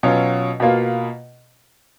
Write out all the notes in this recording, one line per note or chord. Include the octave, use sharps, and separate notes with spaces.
B2 F#3 C#4 F4
B2 A#3 F4